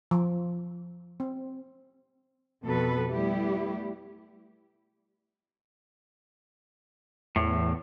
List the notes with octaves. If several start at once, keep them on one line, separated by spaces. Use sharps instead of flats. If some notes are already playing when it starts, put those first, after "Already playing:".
F3
C4
F2 B2 A4 B4
G3 A3 B3 E4 G4
E2 A2